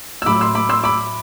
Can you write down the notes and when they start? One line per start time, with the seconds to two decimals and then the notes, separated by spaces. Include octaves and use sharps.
0.22 E6
0.26 A2 F#3 B5 D6
0.41 C6 E6
0.55 B5 D6
0.69 C6 E6
0.84 B5 D6